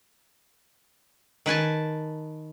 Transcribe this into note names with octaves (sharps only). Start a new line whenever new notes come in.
D#3 B4 G#5 A5